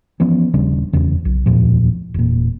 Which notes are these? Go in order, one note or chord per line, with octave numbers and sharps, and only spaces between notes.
E3 F3 B3 C#4
D#1 C#3 G3 D4
D#1 E2 C#3
B1
D1 E2 A#2 F3
E1 A#2